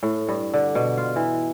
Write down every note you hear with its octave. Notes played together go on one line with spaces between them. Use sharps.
A2
G2
D3
B2
F4
E3